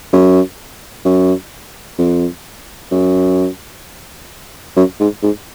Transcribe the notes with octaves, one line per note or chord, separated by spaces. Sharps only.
F#2
F#2
F2
F#2
F#2
G#2
G#2